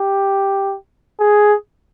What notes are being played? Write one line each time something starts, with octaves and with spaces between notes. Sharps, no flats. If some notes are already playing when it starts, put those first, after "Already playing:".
Already playing: G4
G#4